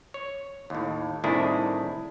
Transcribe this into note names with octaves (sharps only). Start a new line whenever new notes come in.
C#5
D#2 A2
C2 A2 D#3 D4 E4 G#4